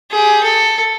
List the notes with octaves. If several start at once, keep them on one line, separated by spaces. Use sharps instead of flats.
G4 G#4
A4